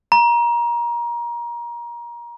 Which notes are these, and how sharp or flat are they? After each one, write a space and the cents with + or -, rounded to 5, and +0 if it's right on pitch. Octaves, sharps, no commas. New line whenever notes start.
A#5 +25